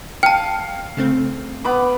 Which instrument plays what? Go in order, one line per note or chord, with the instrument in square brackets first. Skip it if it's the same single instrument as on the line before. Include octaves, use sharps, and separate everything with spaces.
[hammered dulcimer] F5 [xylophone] G5 A5
[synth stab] C#3 A3 C4
[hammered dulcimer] B3 B5 D6